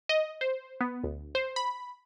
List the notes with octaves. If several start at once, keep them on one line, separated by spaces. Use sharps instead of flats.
D#5
C5
B3
D2
C5
B5